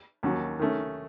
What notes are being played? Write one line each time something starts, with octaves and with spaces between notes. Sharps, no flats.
D#2 D#3 F#3 C#4 F#4
D#3 A3 C#4